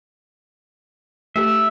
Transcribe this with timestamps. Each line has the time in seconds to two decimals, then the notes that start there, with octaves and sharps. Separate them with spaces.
1.36 A3 G4 A4 E5